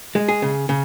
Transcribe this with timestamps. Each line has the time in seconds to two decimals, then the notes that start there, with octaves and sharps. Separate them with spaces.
0.15 G#3
0.29 G#4
0.42 C#3
0.69 C#3